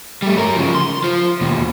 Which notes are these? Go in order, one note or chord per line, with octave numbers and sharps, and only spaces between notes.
G3 A3
F#3 A#4
C#3 F3
C6
F4 C5
D#2 B2